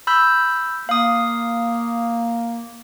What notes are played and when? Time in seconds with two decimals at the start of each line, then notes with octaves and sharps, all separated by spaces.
0.07 B5 E6 G6
0.89 A#3 F5 D#6